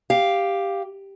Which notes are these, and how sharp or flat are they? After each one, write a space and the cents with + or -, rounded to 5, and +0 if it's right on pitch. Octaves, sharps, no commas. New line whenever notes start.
G4 +5 F5 +0